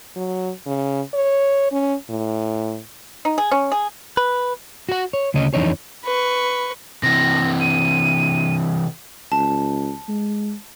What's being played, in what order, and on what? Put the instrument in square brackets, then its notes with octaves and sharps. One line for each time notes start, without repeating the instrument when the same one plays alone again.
[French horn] F#3
C#3
C#5
C#4
A2
[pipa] D#4
G#4
C#4
G#4
[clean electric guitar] B4
F#4 F#5
C#5
D2 C#3 C#4 D#5
F2 E3 D4 D#4 C#5
[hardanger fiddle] B4 C#6
[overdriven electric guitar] C3 E3 [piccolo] A#6
[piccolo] D#7
[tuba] C#2 [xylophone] A5
[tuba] G#3